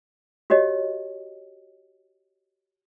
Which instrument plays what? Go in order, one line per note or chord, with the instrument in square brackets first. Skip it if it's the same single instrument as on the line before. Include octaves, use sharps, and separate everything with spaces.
[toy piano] F#4 G4 C#5 D#5